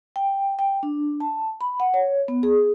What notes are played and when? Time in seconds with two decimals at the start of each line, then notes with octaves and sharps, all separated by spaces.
0.16 G5
0.59 G5
0.83 D4
1.20 A5
1.61 B5
1.80 F#5
1.94 C#5
2.28 B3
2.43 G#4